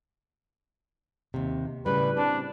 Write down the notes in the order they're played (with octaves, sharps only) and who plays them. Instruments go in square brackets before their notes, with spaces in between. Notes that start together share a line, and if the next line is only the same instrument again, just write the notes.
[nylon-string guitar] D#2 C3
[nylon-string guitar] A2 C#3 G3 [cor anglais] B4
[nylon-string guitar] C4 [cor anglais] D4